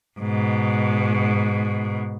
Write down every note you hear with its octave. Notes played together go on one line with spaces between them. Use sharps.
G#2 B2